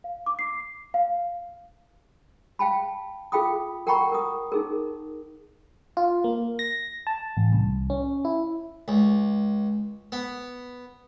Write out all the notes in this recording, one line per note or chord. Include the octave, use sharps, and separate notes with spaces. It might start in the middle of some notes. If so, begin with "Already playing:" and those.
F5
D6
C7
F5
F5 G5 A5 B5
F4 G#4 F5 G5 B5 D#6
A#4 F#5 G5 A#5 B5 C#6
A#4 D#6
D#4 G#4 A#4
F4
A#3
A#6
A5
A1
C2
C#4
E4
C#2
B3